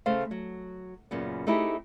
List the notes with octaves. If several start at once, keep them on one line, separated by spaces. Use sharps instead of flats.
C#3 A3 C5 F5
F#3
F#2 A#2 C#3 B3
A3 C4 D#4 E4 G4 G#4